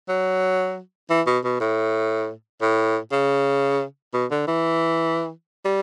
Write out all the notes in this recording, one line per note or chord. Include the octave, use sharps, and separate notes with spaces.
F#3
E3
B2
B2
A2
A2
C#3
B2
D3
E3
G3